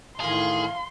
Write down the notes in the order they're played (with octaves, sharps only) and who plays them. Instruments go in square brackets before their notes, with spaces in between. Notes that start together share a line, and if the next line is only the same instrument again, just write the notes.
[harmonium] A2 D#3 F5 [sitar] E3 A#3 F4 [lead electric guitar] G#4 [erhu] C6